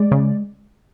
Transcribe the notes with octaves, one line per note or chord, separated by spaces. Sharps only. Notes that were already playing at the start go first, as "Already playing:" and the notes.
Already playing: G#3 D5
C#3